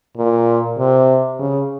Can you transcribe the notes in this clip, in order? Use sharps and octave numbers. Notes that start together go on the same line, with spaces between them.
A#2
C3
C#3